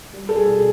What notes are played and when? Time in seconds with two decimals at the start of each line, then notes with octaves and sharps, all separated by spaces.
0.13 G3
0.29 G3 A4
0.36 G#4
0.47 B2